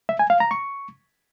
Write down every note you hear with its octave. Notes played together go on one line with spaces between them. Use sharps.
E5
G#5
F5
A#5
C#6